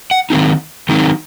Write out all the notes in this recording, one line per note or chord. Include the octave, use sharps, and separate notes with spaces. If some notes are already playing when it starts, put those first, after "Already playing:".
F#5
D#3 F#3 C4 D#4
D#3 F#3 C4 D#4